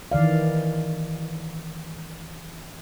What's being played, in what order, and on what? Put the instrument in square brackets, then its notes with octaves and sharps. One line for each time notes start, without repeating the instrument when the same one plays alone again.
[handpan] D#3 E3 D5 F5